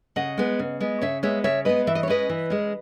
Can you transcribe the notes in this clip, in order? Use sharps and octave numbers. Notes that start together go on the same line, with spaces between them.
C#3 D#5 F#5
G#3 B3
C#3
G#3 B3
C#3 C#5 E5
G#3 B3 C#5 E5
C#3 C#5 E5
G#3 B3 B4 D#5
E3 E5
D#5
C#5
G#3 C#4 B4 D#5
E3
G#3 C#4